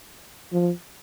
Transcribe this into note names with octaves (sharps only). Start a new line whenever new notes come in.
F3